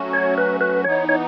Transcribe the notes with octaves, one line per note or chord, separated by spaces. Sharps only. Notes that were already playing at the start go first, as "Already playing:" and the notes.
Already playing: F#3 A3 C#4 F#4
C#5
B4
B4
E3 B3 D#4 C#5
C#5